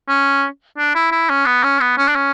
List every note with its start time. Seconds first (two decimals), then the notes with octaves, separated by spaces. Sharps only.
0.09 C#4
0.78 D4
0.95 E4
1.12 E4
1.29 C#4
1.46 B3
1.64 C#4
1.80 B3
1.98 C#4
2.08 D4
2.15 C#4